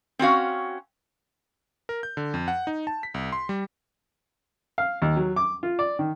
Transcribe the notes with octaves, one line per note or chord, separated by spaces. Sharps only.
C4 C#4 F#4 F5
A#4
G6
D3
F2
F#5
D#4
A5
B6
C2
C6
G3
F5
D#2
F#3
D6
F4
D5
D#3